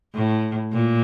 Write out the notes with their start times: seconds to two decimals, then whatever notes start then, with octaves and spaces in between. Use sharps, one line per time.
0.15 A2
0.73 A#2